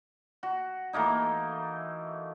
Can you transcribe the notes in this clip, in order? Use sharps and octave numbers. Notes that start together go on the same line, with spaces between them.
F#4
E3 A3 A#3 D#4